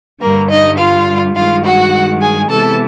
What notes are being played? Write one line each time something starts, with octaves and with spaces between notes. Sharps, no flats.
G2 D3 G3 A#3 A#4
D#4 D#5
F4 F5
G2 D#3 G#3 F4 F5
F#4 F#5
G#4 G#5
C3 E3 G#3 B3 A4 A5